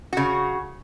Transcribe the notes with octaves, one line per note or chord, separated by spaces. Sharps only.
C#3 F#4